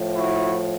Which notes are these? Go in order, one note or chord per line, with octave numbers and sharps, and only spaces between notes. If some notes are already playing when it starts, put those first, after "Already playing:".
Already playing: A2 F3
E4 F#4